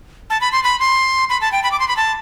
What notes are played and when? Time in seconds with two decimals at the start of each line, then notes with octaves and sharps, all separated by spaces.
0.30 A5
0.41 B5
0.52 C6
0.64 B5
0.80 C6
1.29 B5
1.41 A5
1.52 G5
1.63 B5
1.72 D6
1.80 C6
1.88 B5
1.97 A5